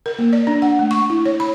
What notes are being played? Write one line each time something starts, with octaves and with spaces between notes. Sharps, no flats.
A#4
A#3
D5
D4
F#5
A3
C#6
E4
C#5
B5